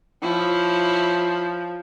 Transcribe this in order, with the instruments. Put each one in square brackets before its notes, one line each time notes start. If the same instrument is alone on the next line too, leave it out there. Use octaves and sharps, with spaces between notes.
[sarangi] F3 [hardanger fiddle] E4 C#5